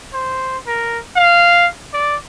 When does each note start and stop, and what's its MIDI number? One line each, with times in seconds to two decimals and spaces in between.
0.13 0.58 72
0.67 0.99 70
1.16 1.67 77
1.93 2.16 74